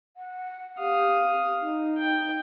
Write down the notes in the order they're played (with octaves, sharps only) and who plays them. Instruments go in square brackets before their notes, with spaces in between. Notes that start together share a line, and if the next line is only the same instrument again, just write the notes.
[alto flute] F#5
[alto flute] G4 [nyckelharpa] F5 D#6
[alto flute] D#4
[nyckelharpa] G5